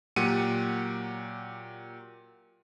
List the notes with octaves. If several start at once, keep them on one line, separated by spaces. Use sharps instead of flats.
A#2 F#3 G4 F#5 C#7 D#7